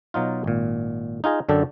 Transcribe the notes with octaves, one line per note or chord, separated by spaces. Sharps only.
B2 F#3 D#4 F4
G#1 A#2
D#4 F4 G#4 D#5
F#2 D3 D4 A4 G5